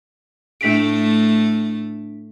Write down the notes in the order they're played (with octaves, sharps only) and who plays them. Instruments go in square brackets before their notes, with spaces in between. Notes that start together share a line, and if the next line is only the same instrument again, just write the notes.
[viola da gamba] A2 A3 [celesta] D4 B6 D7